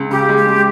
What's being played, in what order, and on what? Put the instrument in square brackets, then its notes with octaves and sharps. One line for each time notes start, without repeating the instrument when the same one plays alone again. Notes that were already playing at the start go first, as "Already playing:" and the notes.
Already playing: [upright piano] C#2
[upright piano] C#3 [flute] G4
[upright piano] G#3
[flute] G4
[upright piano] G#3